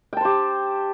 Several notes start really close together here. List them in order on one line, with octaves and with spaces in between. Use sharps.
G5 A5 C5 G4